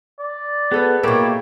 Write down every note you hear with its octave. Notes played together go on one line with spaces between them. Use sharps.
D5
B3 G#4 A4 B4
B2 A#3 E4 G4 C#5 D5